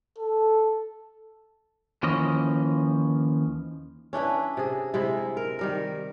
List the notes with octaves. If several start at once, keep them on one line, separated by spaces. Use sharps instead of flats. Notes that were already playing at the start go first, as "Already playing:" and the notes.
A4
D#2 E3 F3 C#4 D#5
C#4 D4 E4 B4
C3 G#4
C3 G#3 E4
A#4
D#3 G3 A#4